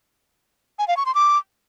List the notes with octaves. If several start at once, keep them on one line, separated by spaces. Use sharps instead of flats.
G#5
F5
C#6
C6
D6